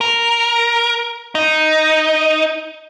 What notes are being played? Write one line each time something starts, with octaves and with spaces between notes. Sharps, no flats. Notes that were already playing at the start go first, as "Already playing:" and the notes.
A#4
D#4